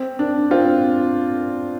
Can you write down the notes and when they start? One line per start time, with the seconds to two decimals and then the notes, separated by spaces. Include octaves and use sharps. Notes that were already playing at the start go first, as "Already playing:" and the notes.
Already playing: C4
0.19 D4
0.51 C4 F4